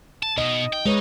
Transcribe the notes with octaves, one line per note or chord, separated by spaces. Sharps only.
A5
B2 D#5
G5
G#3 D#4 B4 C#5